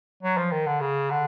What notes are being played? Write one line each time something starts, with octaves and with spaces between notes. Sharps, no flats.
F#3
F3
D#3
D3
C#3
D3